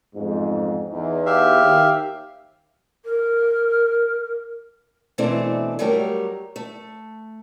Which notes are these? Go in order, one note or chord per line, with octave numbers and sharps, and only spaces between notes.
A1 F2 G#2
E2 D#4
G4 E5 F5
D#2
A#4
B2 D3 E3 A3 C4 D4
F#3 G3 A3 G4 A#4
A3